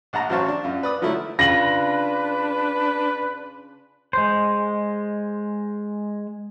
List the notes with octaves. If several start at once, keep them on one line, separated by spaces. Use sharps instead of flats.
A#1 F#5 A5 A#5
A1 F#3 C5 F5 A5 C#6
D4
F#2 F4
B4 D5 D#6
D3 F3 F#3 A3 E4
C#3 D4 F4 B4 A#6 F#7
G#3 C5